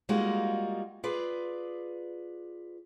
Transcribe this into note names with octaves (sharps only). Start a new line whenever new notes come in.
G3 G#3 A#3 D#4 F4 F#4
F4 G#4 B4 D5